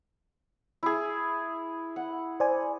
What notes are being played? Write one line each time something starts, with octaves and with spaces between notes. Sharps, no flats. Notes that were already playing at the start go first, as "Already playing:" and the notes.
E4 G#4
F#5
C5 D5 G#5